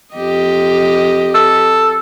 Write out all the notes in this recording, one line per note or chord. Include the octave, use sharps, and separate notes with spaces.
F2 G4 D#5
A4